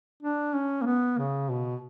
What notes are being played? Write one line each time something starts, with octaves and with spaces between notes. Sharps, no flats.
D4
C#4
A#3
B3
C#3
B2